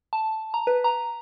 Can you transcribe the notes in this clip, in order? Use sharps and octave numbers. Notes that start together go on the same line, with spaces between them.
A5
A#5
B4
A#5